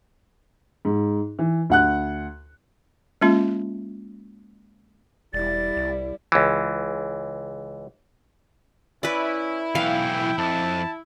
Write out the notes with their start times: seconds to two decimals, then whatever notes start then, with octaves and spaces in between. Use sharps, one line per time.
0.85 G#2
1.39 E3
1.70 D2 F#5 F#6
3.21 G#3 A#3 C#4 F4
5.34 E1 G3 E4 D5 A6
5.76 C2
6.32 C#2 E3
9.03 C#4 E4 B4 D5
9.75 B1 E3 F5 G5
10.38 F2 A5